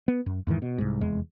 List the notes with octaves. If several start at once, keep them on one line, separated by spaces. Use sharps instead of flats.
B3
F#2
E2 G#2 D#3 E3
B2
C2 G#2
F1 E2 G#3